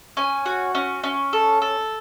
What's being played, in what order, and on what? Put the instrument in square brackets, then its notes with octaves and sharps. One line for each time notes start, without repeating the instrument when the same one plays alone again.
[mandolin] C#4 G#5
F#4
C#4
C#4
A4
A4